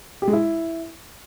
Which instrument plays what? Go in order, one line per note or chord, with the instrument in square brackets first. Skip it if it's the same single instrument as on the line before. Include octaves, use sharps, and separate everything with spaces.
[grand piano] G4
G#3
E4